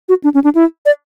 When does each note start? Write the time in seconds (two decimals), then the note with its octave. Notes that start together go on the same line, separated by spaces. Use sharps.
0.09 F#4
0.24 D4
0.34 C#4
0.44 D4
0.55 E4
0.86 D5